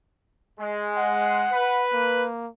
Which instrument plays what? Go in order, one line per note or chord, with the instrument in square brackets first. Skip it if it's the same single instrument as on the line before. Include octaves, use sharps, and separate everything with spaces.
[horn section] G#3
[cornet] F#5
[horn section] B4
[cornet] A#3